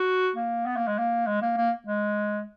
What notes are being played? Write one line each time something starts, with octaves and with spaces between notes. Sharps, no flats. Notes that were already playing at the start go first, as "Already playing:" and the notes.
Already playing: F#4
A#3
B3
A#3
G#3
A#3
G#3
A#3
A#3
G#3